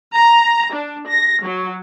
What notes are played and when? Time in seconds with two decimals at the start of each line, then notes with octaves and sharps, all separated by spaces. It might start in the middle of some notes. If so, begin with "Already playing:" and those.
0.14 A#5
0.74 D4
1.08 A#6
1.43 F#3